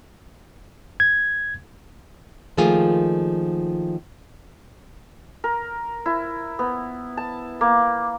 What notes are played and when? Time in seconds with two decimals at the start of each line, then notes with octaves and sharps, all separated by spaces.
1.00 G#6
2.57 D#3 F3 A3 A#3 F4 G#4
5.44 A#4
6.06 E4
6.59 B3
7.17 A5
7.61 A#3